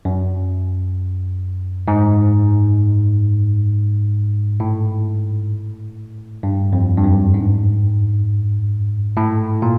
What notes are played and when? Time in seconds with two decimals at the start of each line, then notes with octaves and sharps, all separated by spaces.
0.05 F#2
1.88 G#2
4.60 A2
6.43 G2
6.73 F2
6.97 G2
7.04 F#2
7.34 G#2
9.17 A2
9.62 A#2